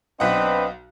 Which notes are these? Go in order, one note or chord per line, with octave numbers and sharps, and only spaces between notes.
B1 C4 D4 B4 D#5 F#5